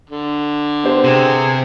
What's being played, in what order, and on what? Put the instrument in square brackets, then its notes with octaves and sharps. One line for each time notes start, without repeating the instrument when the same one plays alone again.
[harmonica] D3
[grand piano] B3 G4 C5
[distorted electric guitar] C3 [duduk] G#4